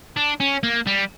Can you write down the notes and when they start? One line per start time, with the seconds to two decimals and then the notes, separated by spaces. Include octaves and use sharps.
0.16 D4
0.40 C#4
0.63 A#3
0.87 G3